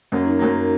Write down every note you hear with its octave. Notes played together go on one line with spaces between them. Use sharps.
F#2 F#3 A#3 C#4
D#4
F#2 F#3 A#3 F#4